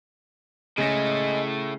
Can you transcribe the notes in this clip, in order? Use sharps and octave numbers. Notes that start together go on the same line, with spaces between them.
A2 C#3 G#3 A3 A#6